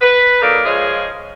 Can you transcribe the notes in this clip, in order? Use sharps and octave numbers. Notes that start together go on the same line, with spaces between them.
B4
F#3 A#3 D#4 A4 A#4 D5
F3 G#3 F4 G#4 C#5